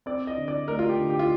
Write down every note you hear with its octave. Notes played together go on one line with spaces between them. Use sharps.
C4 D5
D#5
D3
D5
A3 A#4
F4
G4
D3
G4
F4